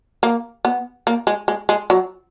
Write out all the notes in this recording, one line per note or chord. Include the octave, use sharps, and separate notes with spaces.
A#3
B3
A#3
G#3
G#3
G#3
F#3